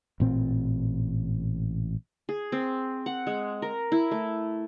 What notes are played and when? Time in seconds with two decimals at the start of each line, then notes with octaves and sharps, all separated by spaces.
0.20 A1 A#2 C4
2.29 G#4
2.52 C4
3.06 F#5
3.27 G#3
3.62 A#4
3.92 E4
4.11 A3